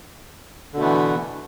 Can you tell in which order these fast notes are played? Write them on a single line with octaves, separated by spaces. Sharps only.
D3 B2 A3 B3 E3